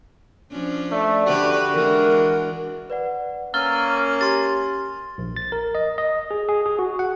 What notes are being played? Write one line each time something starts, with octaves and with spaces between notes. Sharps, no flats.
F3 C#4 D4
A3 D5
D3 F#4 G4 B4
E3 G#3 D4 A#4
B4 D5 F#5
A#3 C#4 E6 F6 A6 G7
G4 C6 A6
A#1
A6
A#4
D#5
D#5
G#4
G#4
G#4
F#4
F#5